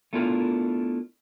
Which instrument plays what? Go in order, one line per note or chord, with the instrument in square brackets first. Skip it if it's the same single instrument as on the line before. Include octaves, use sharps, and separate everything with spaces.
[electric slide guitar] A3 B3 D4 E4 F4 A#4